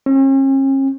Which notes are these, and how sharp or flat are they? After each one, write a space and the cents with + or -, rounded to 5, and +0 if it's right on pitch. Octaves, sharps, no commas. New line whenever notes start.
C#4 -45